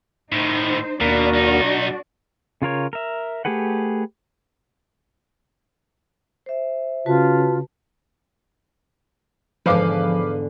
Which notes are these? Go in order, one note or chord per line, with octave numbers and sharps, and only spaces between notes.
A2 D#3 D#4 C5
D#2 B2 A#3 D4 F#4 A#4 D5
B1 D#4
C#3 F4 A#4 C#5
A#4 E5
A3 G4 G#4 B4 F#5
C5 E5
C#3 F4 F#4 B4 A5
E2 G#2 D3 F3 B4 F5 D6